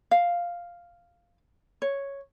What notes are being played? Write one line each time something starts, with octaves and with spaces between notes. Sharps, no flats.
F5
C#5